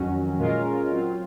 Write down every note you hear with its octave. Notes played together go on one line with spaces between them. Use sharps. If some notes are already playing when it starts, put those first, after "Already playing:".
Already playing: F2 D#3 F#3 C#4 F#4
A#2 G#3 C#4 F4 A#4
F#3 C4 F4